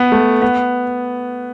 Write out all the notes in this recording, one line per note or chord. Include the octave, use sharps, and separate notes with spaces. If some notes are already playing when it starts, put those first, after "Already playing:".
Already playing: B3
A3
B3